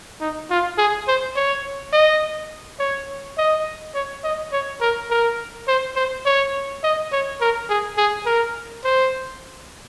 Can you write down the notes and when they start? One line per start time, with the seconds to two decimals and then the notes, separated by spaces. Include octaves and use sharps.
0.21 D#4
0.50 F4
0.78 G#4
1.08 C5
1.36 C#5
1.93 D#5
2.79 C#5
3.38 D#5
3.95 C#5
4.24 D#5
4.52 C#5
4.81 A#4
5.11 A#4
5.68 C5
5.96 C5
6.26 C#5
6.83 D#5
7.12 C#5
7.41 A#4
7.69 G#4
7.98 G#4
8.26 A#4
8.84 C5